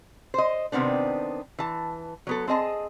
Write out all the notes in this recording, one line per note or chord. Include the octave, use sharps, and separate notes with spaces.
C5 D#5
C3 D#3 B3 C4 D4
E3 A5
F#3 B3 A4
C4 G#4 D#5 A5